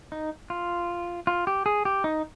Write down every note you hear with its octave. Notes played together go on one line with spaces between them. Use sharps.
D#4
F4
F4
G4
G#4
G4
D#4